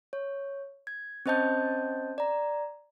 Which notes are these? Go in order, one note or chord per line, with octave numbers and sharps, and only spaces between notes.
C#5
G#6
C4 C#4 C5 D#5 A5 G6
D5 A#5